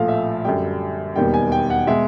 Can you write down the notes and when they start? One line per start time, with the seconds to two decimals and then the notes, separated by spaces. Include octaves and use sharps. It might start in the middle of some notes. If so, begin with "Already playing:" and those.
Already playing: A#1 A2 F3 A3 F5
0.08 E5
0.45 F#2 D3 G3 G5
1.16 E1 D#2 D#3 G3 G5
1.34 G#5
1.52 G5
1.70 F#5
1.87 B2 G#3 E5